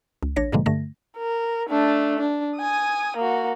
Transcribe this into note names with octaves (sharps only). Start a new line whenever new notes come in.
C#2
A1 D4 C#5 A#6
G#2 B2 D3 F3 G#3 A#3
G2 D3 A3 A#6
A#4
A3 D4
D4
G#5 D#6
A#3 F#4